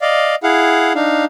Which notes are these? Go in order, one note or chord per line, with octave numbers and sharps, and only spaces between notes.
D5 D#5 F5
E4 G#4 F5 F#5
D4 D#4 F5